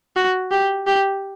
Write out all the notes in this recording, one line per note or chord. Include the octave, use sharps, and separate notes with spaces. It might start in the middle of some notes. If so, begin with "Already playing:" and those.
F#4
G4
G4